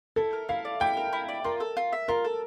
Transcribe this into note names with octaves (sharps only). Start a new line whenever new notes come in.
E4 A4
A#4
E4 F5
D5
E4 G5
A#4
E4
D5
F4 A#4
A4
F4
E5
F4 A#4
A4